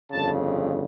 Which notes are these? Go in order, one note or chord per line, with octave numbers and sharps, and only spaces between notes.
G1 F2 C#3 A5